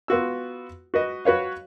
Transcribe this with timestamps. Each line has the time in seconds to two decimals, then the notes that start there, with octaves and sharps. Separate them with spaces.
0.08 B3 F4 F#4 E6
0.94 F#4 B4 D#5
1.25 F#4 B4 C#5 F5